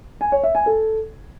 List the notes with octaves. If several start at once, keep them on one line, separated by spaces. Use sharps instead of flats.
G#5
C#5
E5
G#5
A4